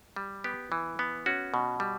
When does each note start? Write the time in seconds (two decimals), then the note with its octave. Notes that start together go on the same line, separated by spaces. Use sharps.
0.16 G3
0.44 B3 G4
0.72 E3
0.99 B3
1.26 C#4 F#4
1.54 B2
1.80 G3